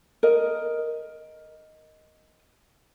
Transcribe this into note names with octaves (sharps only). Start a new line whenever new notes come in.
A#4 D#5